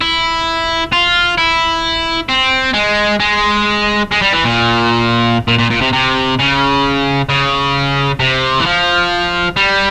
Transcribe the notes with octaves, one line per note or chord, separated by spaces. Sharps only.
E4
F4
E4
C4
G#3
G#3
G#3
G3
E3
A#2
A#2
A#2
A#2
C3
C3
C#3
C#3
C3
E3
F3
G3